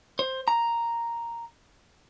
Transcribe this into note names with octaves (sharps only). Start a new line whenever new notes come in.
C5
A#5